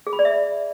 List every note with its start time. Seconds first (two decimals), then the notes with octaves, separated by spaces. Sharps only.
0.07 G#4
0.13 B5
0.19 D5
0.25 E5